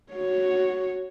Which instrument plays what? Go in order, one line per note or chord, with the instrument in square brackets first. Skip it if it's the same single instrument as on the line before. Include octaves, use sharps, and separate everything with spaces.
[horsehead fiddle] F#4 C#5